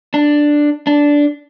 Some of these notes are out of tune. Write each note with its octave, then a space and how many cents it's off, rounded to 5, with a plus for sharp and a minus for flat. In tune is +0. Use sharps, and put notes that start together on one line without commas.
D4 +5
D4 -10